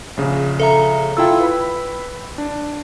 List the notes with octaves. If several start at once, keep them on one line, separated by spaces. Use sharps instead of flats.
A#1 C#3
A4 E5 A#5
E4 F4 A4 G5 E6
B4 B5
D4